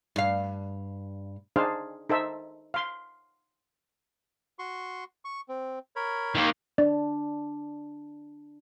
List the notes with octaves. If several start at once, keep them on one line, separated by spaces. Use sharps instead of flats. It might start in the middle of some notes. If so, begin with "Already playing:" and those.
G2 F5
D4 D#4 G#4 C5 F5
D#4 A4 C5 E5
F5 C6
F#4 C6 C#6
C#6
C4
A#4 C#5 B5
D#3 A#3
D4 D5